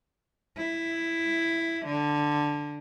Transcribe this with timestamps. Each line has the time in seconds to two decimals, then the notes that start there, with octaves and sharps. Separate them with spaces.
0.57 E4
1.86 D3